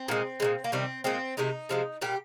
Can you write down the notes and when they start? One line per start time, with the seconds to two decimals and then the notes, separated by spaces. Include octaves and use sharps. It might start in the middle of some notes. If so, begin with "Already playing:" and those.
Already playing: C4
0.08 A#2 G#3
0.40 A#2 F3 G#3
0.64 A#3
0.72 C3 D#3 G3 C4
1.04 A#2 G#3 C4
1.37 C3 D#3 G#3 D#4
1.69 C3 F3 G#3
2.01 A#2 G3 G4